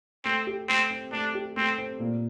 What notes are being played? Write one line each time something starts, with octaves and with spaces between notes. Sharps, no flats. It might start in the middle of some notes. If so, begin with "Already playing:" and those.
A3 C4
G4
A3 C4
C4
A3 D4
G4
A3 C4
C4
A#2